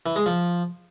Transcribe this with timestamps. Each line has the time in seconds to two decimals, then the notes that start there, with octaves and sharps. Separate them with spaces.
0.06 E3
0.16 G#3
0.26 F3